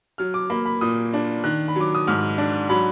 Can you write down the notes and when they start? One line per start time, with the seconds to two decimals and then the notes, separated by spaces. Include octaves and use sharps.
0.18 F#3 F6
0.34 D6
0.50 A#3 B5
0.65 B5
0.81 A#2 D#6
1.13 D4
1.44 D#3 F#6
1.68 B5
1.76 F#3 D6
1.95 D#6
2.07 G#2 F6
2.38 D4
2.69 F#3 B5